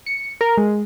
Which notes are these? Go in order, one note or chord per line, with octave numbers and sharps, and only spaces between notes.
C#7
A#4
G#3